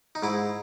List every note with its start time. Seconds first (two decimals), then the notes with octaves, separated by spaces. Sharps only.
0.15 D#4
0.23 G#2 E4